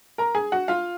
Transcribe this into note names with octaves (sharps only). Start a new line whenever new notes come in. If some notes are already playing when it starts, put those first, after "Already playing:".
A#4 A#5
G#4 G#5
F#4 F#5
F4 F5